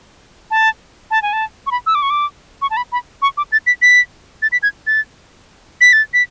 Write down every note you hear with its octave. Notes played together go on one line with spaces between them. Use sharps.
A5
A5
G#5
A5
C#6
B5
E6
D6
C#6
D6
C#6
A5
B5
B5
C#6
D6
A6
B6
B6
A6
B6
G#6
A6
B6
A6
B6